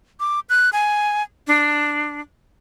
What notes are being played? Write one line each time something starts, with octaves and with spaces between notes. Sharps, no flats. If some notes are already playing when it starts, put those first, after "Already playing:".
D6
F#6
G#5
D4